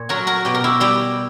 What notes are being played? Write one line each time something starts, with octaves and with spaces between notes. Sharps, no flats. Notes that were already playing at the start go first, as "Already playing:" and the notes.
Already playing: A#2 C#5
F#3 F#4 A#4
F#4 A#4
B2 G4
A#4
E4 G4
G3 E4 G4